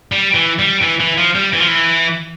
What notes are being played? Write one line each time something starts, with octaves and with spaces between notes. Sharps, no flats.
G3
E3
G3
E3
E3
F3
G3
E3
F3
E3